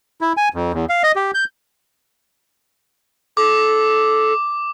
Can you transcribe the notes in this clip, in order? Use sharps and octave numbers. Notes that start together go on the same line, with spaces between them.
E4
G#5
F2
E2
F5
D#5
G4
G6
A4 D6